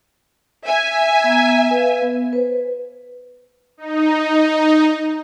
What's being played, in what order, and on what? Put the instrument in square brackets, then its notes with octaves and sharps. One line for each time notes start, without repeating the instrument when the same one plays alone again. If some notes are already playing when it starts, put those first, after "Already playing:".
[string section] E5 G#5
[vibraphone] B3 A#5
B4 F5
B3
B4 C5
[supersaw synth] D#4